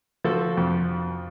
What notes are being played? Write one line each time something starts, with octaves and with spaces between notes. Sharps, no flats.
F3 F#4 A4
F2